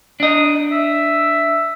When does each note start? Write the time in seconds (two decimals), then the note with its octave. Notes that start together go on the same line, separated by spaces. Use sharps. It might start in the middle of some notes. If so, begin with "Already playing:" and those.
0.20 D4 D#5
0.71 E5